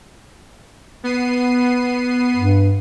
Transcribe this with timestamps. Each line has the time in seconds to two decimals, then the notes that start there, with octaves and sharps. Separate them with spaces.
1.04 B3 C7 D#7
2.36 G2